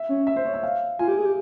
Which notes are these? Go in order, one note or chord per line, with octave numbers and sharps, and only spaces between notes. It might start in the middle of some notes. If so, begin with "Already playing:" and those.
Already playing: E5
C#4
E5
C5
C#5
E5
F5
F4 G#5
G4
G#4
G4